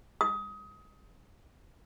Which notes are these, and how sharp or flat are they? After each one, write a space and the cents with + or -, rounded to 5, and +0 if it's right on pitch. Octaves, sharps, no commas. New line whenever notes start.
D#6 +25